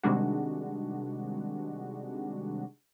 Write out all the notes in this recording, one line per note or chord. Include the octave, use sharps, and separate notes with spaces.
C3 D#3 G3 G#3 D4 F#4